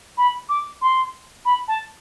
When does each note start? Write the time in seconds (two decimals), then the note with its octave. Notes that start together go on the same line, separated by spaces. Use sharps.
0.18 B5
0.49 D6
0.82 C6
1.45 B5
1.68 A5